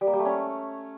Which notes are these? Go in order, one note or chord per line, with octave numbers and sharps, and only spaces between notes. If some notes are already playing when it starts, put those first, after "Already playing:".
G3
A#3
G3
A3
C#4